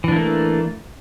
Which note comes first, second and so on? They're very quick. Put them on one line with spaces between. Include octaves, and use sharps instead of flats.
E3 D4 A#3 A3